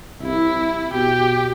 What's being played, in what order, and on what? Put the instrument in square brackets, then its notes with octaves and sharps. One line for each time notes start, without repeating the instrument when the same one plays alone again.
[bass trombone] C2 [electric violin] E4
[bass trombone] B2 [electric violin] G4